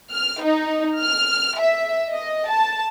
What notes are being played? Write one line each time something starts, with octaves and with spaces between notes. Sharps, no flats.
F6
D#4
F6
E5
D#5
A5